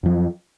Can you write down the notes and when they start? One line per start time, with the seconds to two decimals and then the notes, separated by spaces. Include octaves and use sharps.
0.03 F2
0.06 F3
0.08 F#3